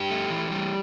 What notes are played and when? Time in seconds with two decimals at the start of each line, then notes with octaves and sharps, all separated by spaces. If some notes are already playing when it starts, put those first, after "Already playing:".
Already playing: G2 G4
0.10 A3
0.30 E3
0.51 G3